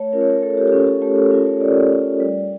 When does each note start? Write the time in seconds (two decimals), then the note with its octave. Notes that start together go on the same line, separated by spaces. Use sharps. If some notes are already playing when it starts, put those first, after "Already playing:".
Already playing: A3 C#5
0.13 C#4 F4 A#4
0.21 C#5
0.30 A#4
0.42 A3 A4
0.57 G4
0.68 G4
0.72 C#4 F4 A4
0.87 G4
1.02 A3 G4
1.16 A4
1.31 C#4 F4 A#4
1.46 C#5
1.61 A3 D5
1.91 C#4 F4
2.20 G3